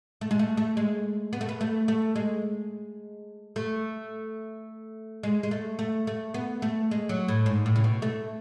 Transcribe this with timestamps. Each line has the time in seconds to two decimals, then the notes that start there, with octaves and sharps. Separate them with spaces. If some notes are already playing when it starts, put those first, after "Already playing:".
0.21 A3
0.31 G#3
0.39 A3
0.57 A3
0.77 G#3
1.33 B3
1.41 A3
1.49 B3
1.61 A3
1.88 A3
2.16 G#3
3.56 A3
5.23 G#3
5.43 G#3
5.51 A3
5.79 A3
6.07 A3
6.34 B3
6.62 A3
6.91 G#3
7.09 F#3
7.28 A2
7.46 G#2
7.66 A2
7.76 C#3
7.84 B2
8.02 A3